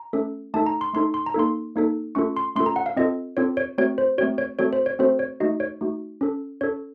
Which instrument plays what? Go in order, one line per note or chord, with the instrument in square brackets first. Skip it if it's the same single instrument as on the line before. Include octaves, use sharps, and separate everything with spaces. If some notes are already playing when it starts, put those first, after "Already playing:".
Already playing: [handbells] A#5
A3 C#4 A4
A3 D#4 A4 A5
A#5
C6
A3 D#4 A4 C6
C6
A#5
A#3 D#4 A4 C6
A#3 D#4 A4
A3 C#4 F4 A4 C#6
C6
A3 C#4 F4 A4 C6
A#5
F#5
F5
C4 F4 A4 D#5
C4 F4 A4 C#5
C#5
A3 C4 F#4 C#5
C5
A3 C4 F#4 C#5
C#5
A3 C4 F#4 A4 C#5
C5
C#5
A3 C4 F#4 A4 C5
C#5
A3 D#4 F#4 D#5
C#5
A3 D#4 F#4
C#4 A4
C#4 A4 C#5